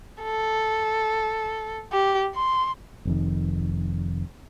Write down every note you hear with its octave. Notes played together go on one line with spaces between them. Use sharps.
A4
G4
C6
F1 F2 D#3